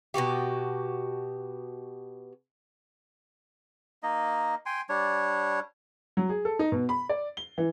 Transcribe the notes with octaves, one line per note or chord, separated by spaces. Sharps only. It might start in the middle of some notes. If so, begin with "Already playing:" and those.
B2 D#3 F#4 G4
A#3 D#4 D#5
G5 G#5 C6
G3 D4 C#5
F#3
G#4
A4
D#4
B2
B5
D5
G7
E3